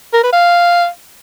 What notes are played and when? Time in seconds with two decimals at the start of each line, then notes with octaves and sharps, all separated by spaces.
0.14 A#4
0.23 B4
0.33 F5